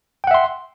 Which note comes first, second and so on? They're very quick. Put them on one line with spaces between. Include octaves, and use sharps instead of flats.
G5 F#5 E5 C6